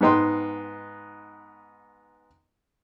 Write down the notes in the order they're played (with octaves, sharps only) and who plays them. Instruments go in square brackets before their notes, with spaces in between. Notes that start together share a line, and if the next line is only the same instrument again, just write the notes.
[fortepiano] G#2 B3 D#4 G5 C6